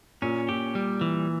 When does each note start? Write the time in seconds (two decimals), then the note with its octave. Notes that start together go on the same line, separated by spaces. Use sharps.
0.22 A#2 C#4
0.49 A#2 G4
0.75 G3
1.01 E3